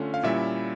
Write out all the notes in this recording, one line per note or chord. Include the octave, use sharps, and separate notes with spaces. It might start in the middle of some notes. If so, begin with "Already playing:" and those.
Already playing: D3 A3 C#4 F4
F5
A#2 G3 C#4 E4 E5